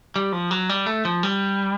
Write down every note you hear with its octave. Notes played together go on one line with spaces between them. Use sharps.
G3
F3
F#3
G3
A3
F3
G3